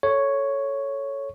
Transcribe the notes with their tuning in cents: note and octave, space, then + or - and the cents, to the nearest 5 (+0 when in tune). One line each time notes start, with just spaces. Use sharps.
A4 +0 C#5 +0